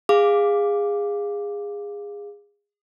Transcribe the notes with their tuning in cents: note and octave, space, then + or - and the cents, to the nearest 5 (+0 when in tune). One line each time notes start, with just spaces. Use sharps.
G#4 -20 F5 +5 D6 +0